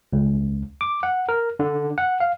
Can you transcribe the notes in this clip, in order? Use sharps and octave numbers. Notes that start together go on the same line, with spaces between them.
C#2
D6
F#5
A#4
D3
F#5
F5